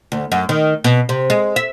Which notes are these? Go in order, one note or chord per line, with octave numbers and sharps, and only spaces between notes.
D2
F#2
D#3
B2
C3
G#3
E5